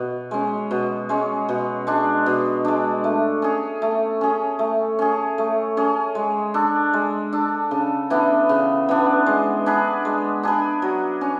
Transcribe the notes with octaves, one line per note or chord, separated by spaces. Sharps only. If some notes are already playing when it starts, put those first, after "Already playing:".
Already playing: B2
G#3 C#4
B2
G#3 C#4
B2
G#3 D4
B2
G#3 D4
A3
C#4 G#4
A3
C#4 G#4
A3
C#4 G#4
A3
C#4 G#4
G#3
D4 A4
G#3
D4 A4
C#3
E3 B3 D4
C#3
E3 B3 D4
G#3
D4 G#4 B4
G#3
D4 G#4 B4
F#3
C#4